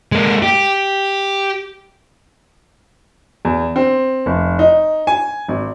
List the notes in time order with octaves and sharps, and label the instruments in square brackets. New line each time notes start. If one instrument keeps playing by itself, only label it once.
[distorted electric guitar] G#3 A#3
G4
[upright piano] E2
C4
F1
D#4
G#5
G#1